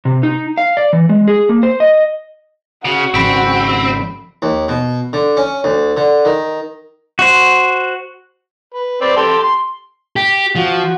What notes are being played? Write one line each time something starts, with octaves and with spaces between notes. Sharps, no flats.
C3
D#4
F5
D5
E3
G#3
G#4
A#3
C5
D#5
C#3 F#4
G#1 C#3 F3 C4 B5 B6 D7
D#2
B2
D3
C#4
D2
D3
D#3
F#4 C5
B4
C4 B4 D5
G4 A4 C6
C6
G4
F3 F#4